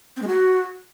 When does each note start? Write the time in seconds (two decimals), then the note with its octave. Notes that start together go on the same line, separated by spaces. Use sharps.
0.17 C4
0.22 G#3
0.27 F#4